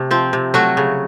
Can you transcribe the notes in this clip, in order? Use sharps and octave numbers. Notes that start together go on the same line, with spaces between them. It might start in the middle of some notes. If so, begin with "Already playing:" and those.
Already playing: C3 A3
F3 C4
C3
F#3 A3 F#4
C#3